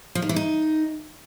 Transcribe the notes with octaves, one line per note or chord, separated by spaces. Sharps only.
F3
D#3
E3
D#4